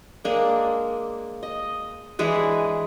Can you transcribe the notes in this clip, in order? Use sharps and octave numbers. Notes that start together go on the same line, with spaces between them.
G#3 A#3 D4
D#5
E3 G#3 D4